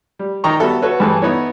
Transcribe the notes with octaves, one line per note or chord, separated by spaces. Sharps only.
G3
D#3 D#4 G5 A#5 C#6
G3 B3 F#4 A4 E5
F#4 A4 B4 C#5
G2 E3 G#4 A4 B4 A5
B3 D#4 E4 C#5